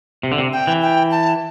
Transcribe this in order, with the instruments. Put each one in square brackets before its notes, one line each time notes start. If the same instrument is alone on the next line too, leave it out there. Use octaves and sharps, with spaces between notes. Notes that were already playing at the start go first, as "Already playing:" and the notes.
[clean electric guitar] C3
D3
C3
[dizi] G5
[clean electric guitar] E3
[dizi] G5
A5